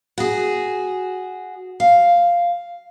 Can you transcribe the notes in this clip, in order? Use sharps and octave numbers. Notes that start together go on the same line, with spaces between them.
F#4 G#4
F5